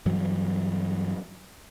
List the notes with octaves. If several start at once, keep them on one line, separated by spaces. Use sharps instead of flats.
G2 E3 F#3